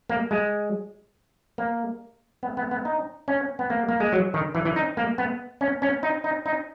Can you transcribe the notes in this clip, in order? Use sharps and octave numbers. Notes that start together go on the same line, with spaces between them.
A#3
G#3
A#3
B3
B3
B3
D#4
C#4
B3
A#3
A#3
G#3
F#3
D#3
E3
E3
D#4
A#3
B3
C#4
C#4
D#4
D#4
D#4